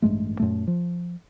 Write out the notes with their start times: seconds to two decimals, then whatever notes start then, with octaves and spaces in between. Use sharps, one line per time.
0.02 A1 G2 G#3 A3
0.39 F#2 A#2 A3
0.67 F3